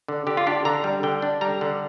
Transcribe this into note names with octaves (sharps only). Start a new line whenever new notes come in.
D3
D3 G4
F4
D4 G4
D3 A#5
G3
D3 G5
D4
G3 A#5
D3